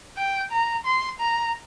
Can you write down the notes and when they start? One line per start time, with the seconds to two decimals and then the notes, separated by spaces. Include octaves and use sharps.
0.17 G5
0.52 A#5
0.86 C6
1.20 A#5